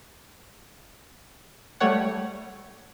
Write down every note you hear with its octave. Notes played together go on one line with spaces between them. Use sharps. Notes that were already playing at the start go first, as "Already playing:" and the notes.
G3 A3 C#5 F#5